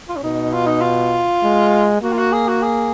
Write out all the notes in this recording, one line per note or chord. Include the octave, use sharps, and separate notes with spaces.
F4
C#4
B2 D#4
F4
D#4
F4
G#3
A#3 F#4
F4
F#4
G#4
F#4
G#4